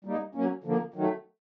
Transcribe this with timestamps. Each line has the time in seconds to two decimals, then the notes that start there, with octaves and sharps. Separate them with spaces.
0.05 G3 A#3 D#4
0.35 F#3 A#3 C#4
0.64 D3 F3 A#3
0.94 D#3 F#3 A3